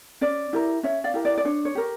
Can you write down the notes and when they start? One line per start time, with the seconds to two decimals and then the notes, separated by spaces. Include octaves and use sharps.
0.21 C#4 D5
0.53 E4 G4 A#4
0.83 C#4 C#5 E5
1.04 D5 F5
1.14 E4 G4 A#4
1.25 D5
1.38 D5
1.45 D4 C#5
1.65 C#5
1.75 G4 A#4